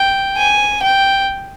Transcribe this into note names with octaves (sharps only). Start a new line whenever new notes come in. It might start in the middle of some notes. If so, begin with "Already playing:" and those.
Already playing: G5
G#5
G5